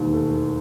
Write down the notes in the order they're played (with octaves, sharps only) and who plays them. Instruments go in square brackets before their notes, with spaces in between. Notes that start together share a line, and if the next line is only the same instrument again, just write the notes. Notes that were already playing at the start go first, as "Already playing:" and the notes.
Already playing: [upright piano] E1 D#2 D#3
A3